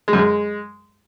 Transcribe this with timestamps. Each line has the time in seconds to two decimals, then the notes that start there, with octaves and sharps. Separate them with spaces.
0.08 G#3
0.13 F#2
0.18 G#3